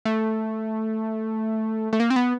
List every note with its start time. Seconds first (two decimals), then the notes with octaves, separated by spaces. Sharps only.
0.05 A3
1.93 A3
2.00 A#3
2.10 C4
2.16 B3